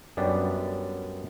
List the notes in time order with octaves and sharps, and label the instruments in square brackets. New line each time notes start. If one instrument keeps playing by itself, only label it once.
[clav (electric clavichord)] F#2 G3 B3 D4